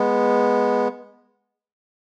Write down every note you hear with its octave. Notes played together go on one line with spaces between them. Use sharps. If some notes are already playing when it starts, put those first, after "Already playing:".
Already playing: G#3 B3